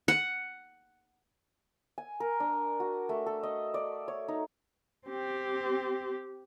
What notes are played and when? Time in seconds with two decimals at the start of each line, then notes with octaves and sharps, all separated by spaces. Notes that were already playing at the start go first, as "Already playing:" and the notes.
0.08 F#5
1.98 G#5
2.20 A#4
2.40 D4
2.80 F#4
3.09 A3
3.26 A4
3.43 D#5
3.74 D5
4.08 C#5
4.28 D#4
5.08 C4 G4